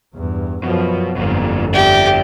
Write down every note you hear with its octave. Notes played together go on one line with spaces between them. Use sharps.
E2 G2
F#2 B2 F3
G1 F2 B2 A#3
G4 D5 E5